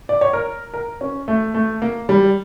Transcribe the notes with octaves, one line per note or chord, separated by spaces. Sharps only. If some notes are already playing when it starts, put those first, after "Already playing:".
D5
C#5
A#4
A#4
C#4
A3
A3
A#3
G3